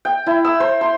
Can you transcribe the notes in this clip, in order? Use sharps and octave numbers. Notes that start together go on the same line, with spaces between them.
G5
E4
E6
C5
C6